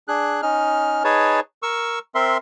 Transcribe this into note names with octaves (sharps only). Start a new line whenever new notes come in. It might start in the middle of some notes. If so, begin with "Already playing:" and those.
D4 G#4 F#6
C#4 D#4 F6
D#4 G#4 B4 C#5 A5
A#4 C#6 E6
C4 A#4 E5 C6